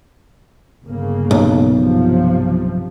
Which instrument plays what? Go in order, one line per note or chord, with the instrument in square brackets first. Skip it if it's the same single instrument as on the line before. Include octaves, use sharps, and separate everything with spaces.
[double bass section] G1 C#3 A#3
[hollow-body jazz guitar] B1
[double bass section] G2 C3 F3